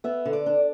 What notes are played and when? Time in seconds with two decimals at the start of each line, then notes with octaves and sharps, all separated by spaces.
0.04 B3 E5
0.25 D3
0.33 D5
0.46 D4